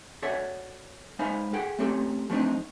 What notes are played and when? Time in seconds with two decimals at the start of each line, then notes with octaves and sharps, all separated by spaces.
0.22 F#4 A4 C#5 D5 E5 F#5
1.19 G#3 D#4 C5 E5 F5 B5
1.53 G#4 A4 F#5 G5
1.79 A3 C4 C#4 G4 A4
2.30 F3 A3 C4 D4 D#4